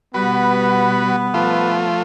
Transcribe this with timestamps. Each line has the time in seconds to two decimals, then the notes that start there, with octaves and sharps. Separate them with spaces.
0.14 B2 G3 B3 F#4 B4 B5
1.34 F3 A3 F4